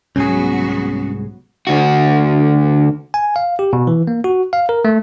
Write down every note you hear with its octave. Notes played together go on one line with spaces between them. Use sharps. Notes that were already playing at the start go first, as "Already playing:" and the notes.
C2 G#2 F#3 B3 C#4 F#4 G#4
D2 F#4
G#5
F5
G4
B2
E3
A#3
F#4
F5
A#4
A3